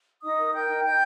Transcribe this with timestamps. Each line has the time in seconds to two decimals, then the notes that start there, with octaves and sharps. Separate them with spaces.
0.23 D#4 D#5 D#6
0.38 A#4
0.53 A#4 G5 G6
0.68 D#4
0.83 D#4 G5 G6